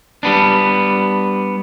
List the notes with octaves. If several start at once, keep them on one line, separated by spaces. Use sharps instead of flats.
G3 B3 D4